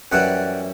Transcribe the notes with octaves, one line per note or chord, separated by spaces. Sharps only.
F#2 E3 G3 D5 F#5